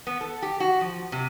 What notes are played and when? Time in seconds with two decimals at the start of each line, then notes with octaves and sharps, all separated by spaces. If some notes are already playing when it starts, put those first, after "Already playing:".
0.07 B3
0.21 A4
0.42 G4
0.60 F#4
0.81 F3
1.12 C3